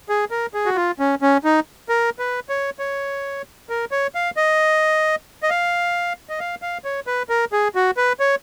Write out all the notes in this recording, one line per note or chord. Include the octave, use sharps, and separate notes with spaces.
G#4
A#4
G#4
F#4
F4
C#4
C#4
D#4
A#4
B4
C#5
C#5
A#4
C#5
F5
D#5
D#5
F5
D#5
F5
F5
C#5
B4
A#4
G#4
F#4
B4
C#5